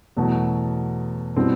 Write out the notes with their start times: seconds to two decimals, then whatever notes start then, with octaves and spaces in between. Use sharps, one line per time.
0.16 E2 B2 F#3 A3
1.36 B2 G3 C4 E4